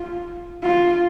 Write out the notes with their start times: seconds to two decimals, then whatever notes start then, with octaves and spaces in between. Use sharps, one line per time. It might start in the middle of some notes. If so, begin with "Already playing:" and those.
Already playing: F4
0.63 F4